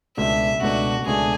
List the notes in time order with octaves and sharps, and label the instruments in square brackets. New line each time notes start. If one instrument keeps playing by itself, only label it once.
[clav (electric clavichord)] C#2 B2 A3 D4 [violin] E5
[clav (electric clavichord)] C#2 B2 A3 D4 [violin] F#4
[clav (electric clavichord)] C#2 B2 A3 D4 [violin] G#4